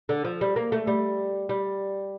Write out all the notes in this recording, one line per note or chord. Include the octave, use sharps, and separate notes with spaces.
D3
F3
G3
A#3
A3
G3
G3